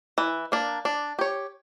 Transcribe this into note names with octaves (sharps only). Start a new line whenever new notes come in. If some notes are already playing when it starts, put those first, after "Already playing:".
E3
A#3 D4
D4
G4 C#5